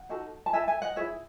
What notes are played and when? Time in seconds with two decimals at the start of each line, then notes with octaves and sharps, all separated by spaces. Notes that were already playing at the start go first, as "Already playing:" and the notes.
Already playing: F#5
0.09 D#4 F#4 A4
0.46 A5
0.53 E4 A4 E5 G#5
0.68 E5 G#5
0.82 D#5 F#5
0.96 G#4 C#5 E5
1.01 E4